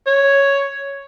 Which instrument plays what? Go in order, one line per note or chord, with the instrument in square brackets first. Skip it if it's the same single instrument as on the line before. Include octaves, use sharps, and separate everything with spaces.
[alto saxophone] C#5